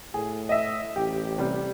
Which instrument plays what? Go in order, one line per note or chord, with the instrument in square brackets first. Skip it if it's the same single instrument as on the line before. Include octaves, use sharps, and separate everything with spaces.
[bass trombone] A2 [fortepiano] G#4
[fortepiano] D#5 E5
[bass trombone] A1 [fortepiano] G4
[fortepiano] C3 G3